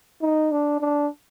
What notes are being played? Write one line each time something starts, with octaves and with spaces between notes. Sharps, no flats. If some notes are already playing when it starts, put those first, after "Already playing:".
D#4
D4
D4